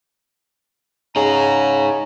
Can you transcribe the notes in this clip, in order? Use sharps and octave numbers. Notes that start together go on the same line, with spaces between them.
C#3 D#4 G#4 A#5